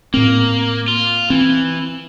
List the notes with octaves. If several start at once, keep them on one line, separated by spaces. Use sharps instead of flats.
A2 A#3 C4
F4
E3 C4